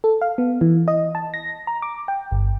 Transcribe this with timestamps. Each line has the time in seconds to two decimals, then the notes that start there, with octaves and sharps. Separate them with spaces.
0.04 A4
0.21 F5
0.38 B3
0.61 E3
0.88 D#5
1.15 A5
1.34 A#6
1.67 A#5
1.82 D6
2.08 G5
2.31 G1